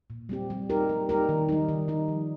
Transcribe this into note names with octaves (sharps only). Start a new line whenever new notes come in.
A#2
G3 C4 G4
G3
D#4 G4 A#4
G3
D#4 G4 A#4
D#3
G3 D#4
D#3
G3 D#4
F3